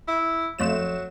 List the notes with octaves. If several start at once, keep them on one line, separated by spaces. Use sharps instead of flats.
E4
F2 F#3 A3 E7